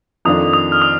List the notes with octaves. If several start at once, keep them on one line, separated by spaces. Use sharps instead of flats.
F2 D#3 A3 D4 F4 D#6
D#6
F6
D#6